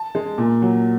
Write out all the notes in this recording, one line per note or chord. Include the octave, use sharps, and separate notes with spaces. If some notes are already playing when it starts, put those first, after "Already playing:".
Already playing: A5
G#3
A#2
F#3